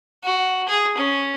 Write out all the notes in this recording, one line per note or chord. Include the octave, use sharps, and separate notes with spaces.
F#4
G#4
C#4